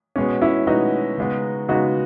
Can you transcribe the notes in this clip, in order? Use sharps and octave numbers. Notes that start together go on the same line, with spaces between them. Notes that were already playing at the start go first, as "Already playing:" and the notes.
B2 G#3 B3 C#4
C#4 E4
B2 G#3 B3 D#4 F#4
C#3 G#3 B3
C#3 G#3 B3 D#4 F#4